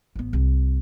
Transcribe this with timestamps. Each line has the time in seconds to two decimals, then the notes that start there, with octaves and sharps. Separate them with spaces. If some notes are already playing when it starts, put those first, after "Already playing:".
0.15 A1 B3
0.33 C2